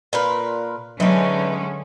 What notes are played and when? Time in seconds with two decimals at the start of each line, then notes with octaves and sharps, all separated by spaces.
0.13 A#2 A#4 B4
1.00 D3 E3 F#3 G#3 C#4 D#4